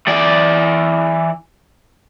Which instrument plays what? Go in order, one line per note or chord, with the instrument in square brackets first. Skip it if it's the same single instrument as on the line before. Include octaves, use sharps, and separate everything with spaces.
[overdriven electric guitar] E3 D5